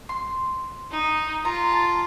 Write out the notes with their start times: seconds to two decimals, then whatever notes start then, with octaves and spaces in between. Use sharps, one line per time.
0.09 C6
0.91 D#4
1.45 F4 A#5
1.72 A5